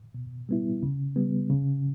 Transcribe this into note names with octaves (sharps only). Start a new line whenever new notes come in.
B2
G3 B3 E4
C#3
G3 B3
C#3